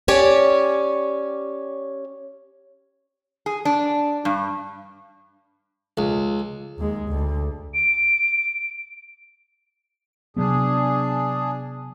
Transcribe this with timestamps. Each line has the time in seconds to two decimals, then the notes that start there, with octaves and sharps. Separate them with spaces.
0.08 C#4 G4 C#5 D5
3.46 G#4
3.65 D4
4.25 G2
5.97 C#2
6.78 D#2 G#3
7.09 D2
7.74 D7
10.37 C3 F#3 B3 D4 G#4